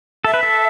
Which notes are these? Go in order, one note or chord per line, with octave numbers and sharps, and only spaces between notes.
A4 E5
B4
A4